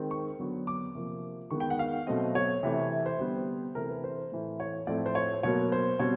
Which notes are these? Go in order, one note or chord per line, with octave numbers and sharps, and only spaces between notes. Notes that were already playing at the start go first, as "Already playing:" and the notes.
Already playing: D#3 G#3 C4
C#6
D3 F#3 B3
D6
C3 F3 A#3
D#3 G#3 B3 C#6
G5
F#5
F5
B2 F#3 A3 C4 D#5
C#5
C3 E3 A3
C5
D3 G3 B3
C3 E3 A3 C4 A#4
B4
C5
A2 E3 A3
C#5
A2 F3 A3 C4 D5
C5
C#5
B2 F#3 A#3 C#5
C5
B2 G3 C4 C#5